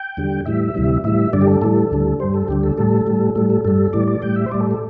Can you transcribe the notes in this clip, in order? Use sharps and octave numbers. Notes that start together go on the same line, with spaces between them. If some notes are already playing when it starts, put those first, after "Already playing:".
Already playing: G5
E2 D3 G3
A2 E3 G3 E5
D2 C3 E3 G3
A2 E3 G3 E5
G2 D3 G3 D5
G4
A4
A2 E3 G3 A4
D2 D3 G3
G2 G3 C5
A4
D2 D3 G3 G4
A4
A2 G3 A4
A2 G3
A2 G3 A4
A4
G2 G3 A4
A2 E3 G3 D5
D5
A2 G3 G5
E5
C5
A2 G3 D5
A4
A4